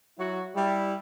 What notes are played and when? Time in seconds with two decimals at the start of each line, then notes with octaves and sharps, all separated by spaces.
0.18 F#3 E4 F#4
0.55 G3 E4